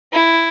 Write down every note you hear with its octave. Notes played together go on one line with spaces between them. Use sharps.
E4